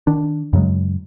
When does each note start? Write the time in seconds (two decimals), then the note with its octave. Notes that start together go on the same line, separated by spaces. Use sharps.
0.07 D#3 D4
0.53 F#2 C#3 F#3 G#3